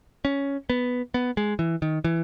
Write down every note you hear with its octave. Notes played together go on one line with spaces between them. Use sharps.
C#4
B3
B3
G#3
E3
D#3
E3